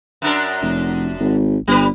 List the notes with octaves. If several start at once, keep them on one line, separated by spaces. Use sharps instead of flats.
F#2 D4 A#4
F1
G#1
G1 G3 B4